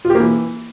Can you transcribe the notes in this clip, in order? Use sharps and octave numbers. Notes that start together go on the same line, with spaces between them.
F4
G4
A#3
E3